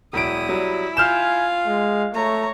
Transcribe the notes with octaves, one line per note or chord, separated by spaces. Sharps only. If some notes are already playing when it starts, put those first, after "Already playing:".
E1 F#3 E4 D#6 D7
F#3 G3
F4 F5 G#5 F6 G6 E7
G#3
A3 C#5 A#5